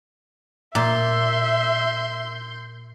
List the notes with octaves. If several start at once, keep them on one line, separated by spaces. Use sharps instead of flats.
A#2 E5 C6 G6